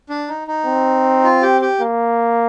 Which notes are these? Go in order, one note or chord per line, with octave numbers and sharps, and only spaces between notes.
D4
D#4
D#4
C4
F4
G4
G4
A#3